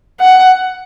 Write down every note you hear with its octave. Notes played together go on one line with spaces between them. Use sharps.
F#5